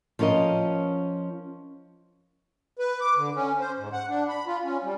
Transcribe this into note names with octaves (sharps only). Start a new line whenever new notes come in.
F3 C#4 F4 A#4 D#5
B4
D6
D3
C#4
C5
G#2
F#5
D4
B5
F4
C#4
G3